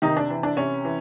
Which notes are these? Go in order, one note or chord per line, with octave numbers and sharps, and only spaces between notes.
C3 D#3 D#4
D4
E3
D4
C3 C#4
E3